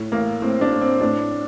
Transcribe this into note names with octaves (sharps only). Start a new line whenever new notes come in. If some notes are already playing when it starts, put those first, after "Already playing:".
Already playing: A2
A1 A#3
A2 C4
D4
A2
C4
A2 D4